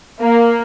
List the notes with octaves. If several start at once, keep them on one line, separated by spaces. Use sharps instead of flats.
A#3